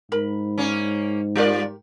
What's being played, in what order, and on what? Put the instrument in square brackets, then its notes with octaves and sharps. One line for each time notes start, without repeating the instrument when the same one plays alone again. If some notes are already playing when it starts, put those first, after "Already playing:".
[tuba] G#2 [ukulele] A#4 B5
[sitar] A#3 C#4
[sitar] G3 F4 D5 [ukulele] G4 A#4